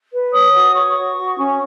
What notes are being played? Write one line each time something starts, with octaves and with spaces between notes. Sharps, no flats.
B4
C#5 D#6
F#4
C#5 C#6
F#4
F#4
C#4